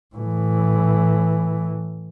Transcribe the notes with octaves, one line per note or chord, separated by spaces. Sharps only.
A2 E3